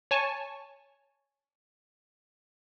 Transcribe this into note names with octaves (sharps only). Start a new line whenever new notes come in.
C#5 G#5 A5 C#6